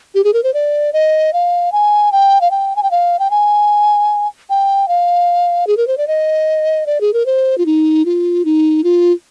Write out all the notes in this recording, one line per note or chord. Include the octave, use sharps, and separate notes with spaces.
G4
G#4
A#4
C5
D5
D#5
F5
G#5
G5
F5
G5
G#5
G5
F5
G5
G#5
G5
F5
G#4
A#4
C5
D5
D#5
D5
G#4
A#4
C5
F4
D#4
F4
D#4
F4